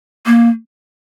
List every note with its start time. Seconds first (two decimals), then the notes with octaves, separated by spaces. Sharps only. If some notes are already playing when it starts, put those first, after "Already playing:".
0.26 A#3